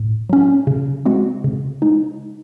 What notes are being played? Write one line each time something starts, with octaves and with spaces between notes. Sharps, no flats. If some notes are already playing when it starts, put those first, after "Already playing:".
Already playing: A2
F#3 C#4
C#3
G#3 C4 F#4
C#3
G#3 D#4